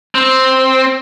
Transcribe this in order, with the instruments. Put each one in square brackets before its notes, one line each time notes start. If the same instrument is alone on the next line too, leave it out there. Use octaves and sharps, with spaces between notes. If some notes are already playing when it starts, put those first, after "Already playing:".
[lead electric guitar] C4